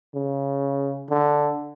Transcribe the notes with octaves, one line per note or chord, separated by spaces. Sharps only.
C#3
D3